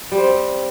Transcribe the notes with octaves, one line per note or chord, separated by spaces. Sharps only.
G3
C5
C4